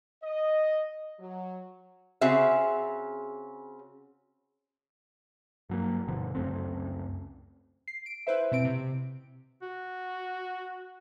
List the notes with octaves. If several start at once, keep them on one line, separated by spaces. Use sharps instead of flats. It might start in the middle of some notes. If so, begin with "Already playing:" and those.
D#5
F#3
C#3 C4 F#4 G#4 E5
G2 F#3 A#3
G1 B2 D3 F3
C#2 F#2 A3 C4
C7
D7
E4 B4 C5 E5
B2 C4 D7
C3
F#4